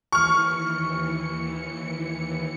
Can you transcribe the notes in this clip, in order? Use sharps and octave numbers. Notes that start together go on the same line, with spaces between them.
D#2 E3 C#6 F6 C#7